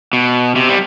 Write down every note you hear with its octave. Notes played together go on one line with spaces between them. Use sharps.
B2
C3
G3